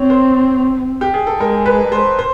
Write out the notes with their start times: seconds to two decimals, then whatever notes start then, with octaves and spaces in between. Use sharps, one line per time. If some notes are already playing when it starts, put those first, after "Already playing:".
Already playing: C4 C#5
0.10 C5
1.01 G4
1.14 G#4
1.27 A4
1.40 G#3 A#4
1.66 B4
1.92 C5
2.19 C5